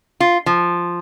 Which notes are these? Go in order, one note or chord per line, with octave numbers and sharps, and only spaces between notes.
F4
F3